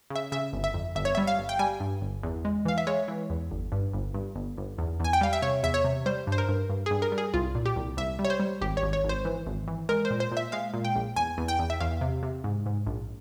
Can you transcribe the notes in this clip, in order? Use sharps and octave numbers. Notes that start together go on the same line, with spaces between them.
C#3
E5
C#3 E5
G1
E5
F2
G1 E5
C#5
E5
G3
F5
G1
G5
G3 G#5
G2
G1
E2
G#3
E3 F5
E5
G#3 C#5
E3
E2
G1
G2
G1
G2
G1
G1
E2
E2 G#5
G5
G3 F5
E5
C3 C#5
E2 E5
C#5
C3
G3 C5
G2
C5
A#4
G2
G2
G#4
G2
A#4
G3
G#4
C2 F4
A#2
G4
C2
C2 E5
G3
C#5
C5
G3
G#1 G4
C#5
G#1
C#5
G#1
C5
E3
G#1
E3
G#3 A#4
C5
A#2
C5
A#2
E5
G#3 F5
A#2
G5
A#1
E2 G#5
E2
G5
E2
E5
E2 F5
C3
C3
G#2
G#2
A#1